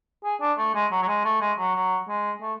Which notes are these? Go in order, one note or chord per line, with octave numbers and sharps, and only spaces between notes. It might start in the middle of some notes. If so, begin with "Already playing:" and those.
G#4
D4
A3
G#3
F#3
F#3
G#3
A3
G#3
F#3
F#3
G#3
A3